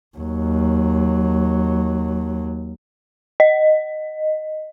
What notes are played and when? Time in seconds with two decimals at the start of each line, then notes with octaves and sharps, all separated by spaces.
0.18 D#2 F#3
3.40 D#5